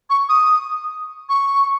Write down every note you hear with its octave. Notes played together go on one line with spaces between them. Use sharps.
C#6
D#6
C#6